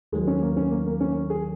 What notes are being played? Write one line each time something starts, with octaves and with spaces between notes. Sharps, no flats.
D#2 D#3 F#3 G#3
C#4
A#3
C#4
A#3
A#3
C#4
G#4